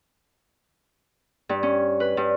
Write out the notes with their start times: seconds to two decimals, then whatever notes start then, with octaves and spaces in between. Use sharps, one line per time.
1.49 G2
1.63 C#4
2.00 B4
2.17 G2